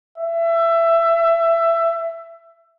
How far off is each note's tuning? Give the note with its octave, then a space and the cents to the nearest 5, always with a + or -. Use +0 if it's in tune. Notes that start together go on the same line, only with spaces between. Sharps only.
E5 +20